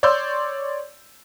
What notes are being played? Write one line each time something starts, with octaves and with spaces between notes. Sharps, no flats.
C#5 D5 C6 E6 G6